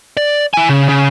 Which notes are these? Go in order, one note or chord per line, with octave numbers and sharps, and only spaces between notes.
D5
E4 G#5
C#3
C#3